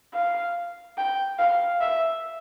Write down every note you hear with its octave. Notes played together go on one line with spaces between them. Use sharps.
F5
G5
F5
E5